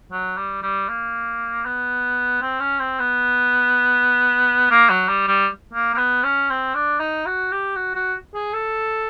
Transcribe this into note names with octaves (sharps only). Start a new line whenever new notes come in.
F#3
G3
G3
A#3
B3
C4
C#4
C4
B3
A#3
F#3
G3
G3
A#3
A#3
B3
C#4
C4
D4
D#4
F#4
G4
F#4
F#4
G#4
A4